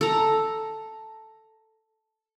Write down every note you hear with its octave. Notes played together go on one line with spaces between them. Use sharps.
A4 A#5